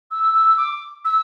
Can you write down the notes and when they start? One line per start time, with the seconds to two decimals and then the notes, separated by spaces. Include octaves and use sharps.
0.11 E6
0.34 E6
0.57 D6
1.04 E6